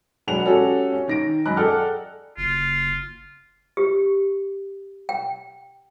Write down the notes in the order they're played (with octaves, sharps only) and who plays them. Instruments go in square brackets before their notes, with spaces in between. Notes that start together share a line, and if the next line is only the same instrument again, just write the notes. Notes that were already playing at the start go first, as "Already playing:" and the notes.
[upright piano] E1 F#3 G#3 F#5 F7
C#4 F#4 G4 A4
C#4
D#3 A#6 D7
F#2 D#5 A#5 B5 F#6
G#4 A4 D5 F#5 G5 F6
[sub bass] F#1 [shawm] F4
[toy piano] G4
G5